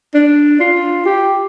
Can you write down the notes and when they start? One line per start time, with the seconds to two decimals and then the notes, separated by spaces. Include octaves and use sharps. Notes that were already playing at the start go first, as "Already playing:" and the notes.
0.14 D4
0.60 F4
1.05 G4